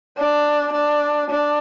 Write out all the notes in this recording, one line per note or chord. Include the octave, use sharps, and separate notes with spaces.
D4
D4
D4